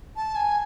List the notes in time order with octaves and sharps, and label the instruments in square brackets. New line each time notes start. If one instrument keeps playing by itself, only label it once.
[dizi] A5
G#5